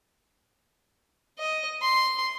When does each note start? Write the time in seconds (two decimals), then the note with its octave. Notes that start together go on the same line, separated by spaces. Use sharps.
1.39 D#5
1.82 C6